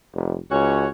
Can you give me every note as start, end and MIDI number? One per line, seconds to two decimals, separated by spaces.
0.15 0.38 29
0.51 0.88 37
0.51 0.88 61
0.51 0.88 66
0.51 0.88 73